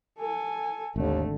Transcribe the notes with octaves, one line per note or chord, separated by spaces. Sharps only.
A4 G#5
G#1 D#2 D3 A3